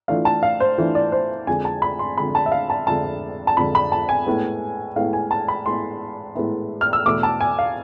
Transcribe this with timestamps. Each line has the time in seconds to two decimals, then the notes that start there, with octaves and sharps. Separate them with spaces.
0.08 E3 A3 D4 F4 F5
0.25 A5
0.43 F5
0.60 C5
0.78 E3 A3 D4 F4
0.95 D5
1.12 C5
1.47 F2 D3 G#3 G#5
1.65 A5
1.82 B5
1.99 C6
2.18 F2 D3 G#3 B5
2.35 A5
2.46 E5
2.52 F5
2.70 A5
2.87 F2 D3 G#3 A5
3.47 A5
3.57 F2 D3 G#3 B5
3.75 B5
3.92 A5
4.09 G#5
4.26 A2 G#3 B3 E4
4.96 A2 G#3 B3 E4 F5
5.13 G#5
5.31 A5
5.48 B5
5.66 A2 G#3 B3 E4 C6
6.35 A2 G#3 B3 E4
6.81 F6
6.93 E6
7.06 E2 B2 A3 E4 D6
7.23 A5
7.41 G#5
7.59 F5